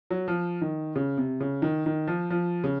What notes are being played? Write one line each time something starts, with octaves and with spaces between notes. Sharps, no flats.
F#3
F3
D#3
C#3
C3
C#3
D#3
D#3
F3
F3
C#3